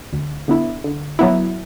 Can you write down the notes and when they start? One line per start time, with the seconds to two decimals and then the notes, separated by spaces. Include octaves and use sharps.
0.13 D2
0.48 D3 B3 E4
0.84 D3
1.19 F#3 B3 E4